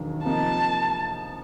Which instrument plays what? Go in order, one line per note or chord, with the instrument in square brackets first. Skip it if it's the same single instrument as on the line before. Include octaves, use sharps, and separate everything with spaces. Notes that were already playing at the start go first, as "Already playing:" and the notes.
Already playing: [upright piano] E1 D#2 D#3 F#3
[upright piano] C3 F3 A#3 D#4 [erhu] A5